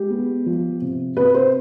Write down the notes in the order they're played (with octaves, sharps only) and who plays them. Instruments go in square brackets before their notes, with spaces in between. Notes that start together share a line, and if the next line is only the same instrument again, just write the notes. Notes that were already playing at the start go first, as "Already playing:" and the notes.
Already playing: [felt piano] G#3 G4
B3
F3
C3
C3 B4
C5